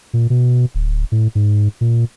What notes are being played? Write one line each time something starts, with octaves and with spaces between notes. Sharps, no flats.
A#2
B2
D1
A2
G#2
A#2